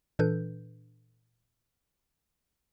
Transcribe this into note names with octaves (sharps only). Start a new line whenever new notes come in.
A#2 E3 D4 A4 B4 G6